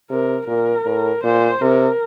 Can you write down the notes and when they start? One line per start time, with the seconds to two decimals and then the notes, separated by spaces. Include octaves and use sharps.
0.10 C3 A#4
0.47 A#2 A#4
0.85 A2
1.24 A#2 C5
1.61 C3 A#4